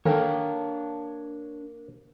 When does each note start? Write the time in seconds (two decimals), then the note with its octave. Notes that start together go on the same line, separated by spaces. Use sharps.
0.05 D#3 A#3 D4 A4 C#5 G5